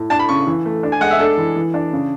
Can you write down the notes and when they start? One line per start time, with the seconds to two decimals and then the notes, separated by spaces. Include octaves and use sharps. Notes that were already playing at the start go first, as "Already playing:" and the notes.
Already playing: A2
0.10 D4 A5
0.19 B5
0.29 C#3 C#6
0.47 E3
0.65 A3
0.83 D4
0.92 G#5
1.01 G#3 F#5
1.11 E5
1.19 D4 A4
1.37 E3
1.56 E3
1.74 D4
1.93 C#3